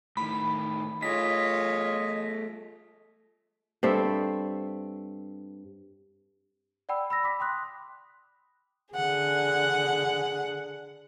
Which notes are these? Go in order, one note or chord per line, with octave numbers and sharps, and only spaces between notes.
A2 D#3 B5
A3 F4 G#4 C#5 D#5 B6
G2 C4 A4 E5
D5 F#5 G5 B5 E6
B5 E6 A#6
B5 D6 B6
G5 C6 D#6 F#6
D3 G#4 F#5